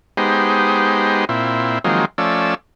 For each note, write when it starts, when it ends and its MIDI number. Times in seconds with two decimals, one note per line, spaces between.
0.17 1.25 56
0.17 1.25 59
0.17 1.25 63
0.17 1.25 67
0.17 1.25 72
1.29 1.79 46
1.29 1.79 60
1.29 1.79 64
1.84 2.05 51
1.84 2.05 53
1.84 2.05 54
1.84 2.05 56
1.84 2.05 58
1.84 2.05 60
2.18 2.55 53
2.18 2.55 57
2.18 2.55 61
2.18 2.55 74
2.18 2.55 88